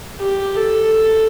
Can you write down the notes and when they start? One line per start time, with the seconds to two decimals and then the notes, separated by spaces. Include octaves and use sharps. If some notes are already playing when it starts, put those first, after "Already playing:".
0.20 G4
0.58 A4